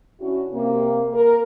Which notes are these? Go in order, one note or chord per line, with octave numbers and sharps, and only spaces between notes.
D3 C#4 E4 F#4
C3 A#3
A#4